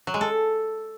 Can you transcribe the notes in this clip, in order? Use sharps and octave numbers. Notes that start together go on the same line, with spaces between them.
F#3
G#3
A4